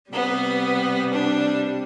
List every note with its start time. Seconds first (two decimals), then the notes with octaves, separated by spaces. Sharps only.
0.11 C3 G3 B3
1.13 D4